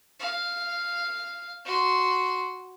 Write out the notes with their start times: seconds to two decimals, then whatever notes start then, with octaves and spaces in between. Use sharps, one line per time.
0.20 F5
1.65 F#4 C6